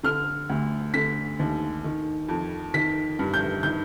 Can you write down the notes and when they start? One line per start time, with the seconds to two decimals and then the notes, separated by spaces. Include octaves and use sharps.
0.04 D3 F6
0.50 D2
0.94 D3 B6
1.39 D#2
1.84 D#3
2.29 F2
2.74 D#3 B6
3.19 G2
3.34 G6
3.63 D#3 G6